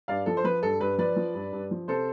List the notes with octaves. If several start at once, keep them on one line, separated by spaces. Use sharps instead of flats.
G2 D5 F5
F3 A4
C5
F3 B4
G2 A4
G2 B4
F3 B4 D5
F3
G2
G2
F3
C3 A4 C5